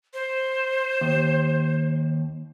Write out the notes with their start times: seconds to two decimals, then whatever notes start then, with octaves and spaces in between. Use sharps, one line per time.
0.14 C5
1.01 D#2